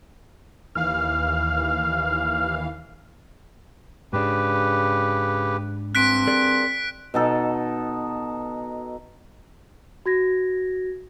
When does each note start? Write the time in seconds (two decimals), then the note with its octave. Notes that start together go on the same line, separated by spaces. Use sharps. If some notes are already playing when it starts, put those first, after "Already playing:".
0.75 D#2 E3 F5 F6
4.13 G#2 C#3 D4 G4 B4
5.95 G2 C4 F#6 B6 D7
6.27 G#4 A#4 D5
7.14 B2 D#4 A4
10.06 F#4 G#6 A#6